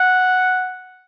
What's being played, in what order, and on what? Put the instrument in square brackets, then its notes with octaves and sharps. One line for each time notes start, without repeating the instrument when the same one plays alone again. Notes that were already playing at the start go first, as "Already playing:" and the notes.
Already playing: [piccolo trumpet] F#5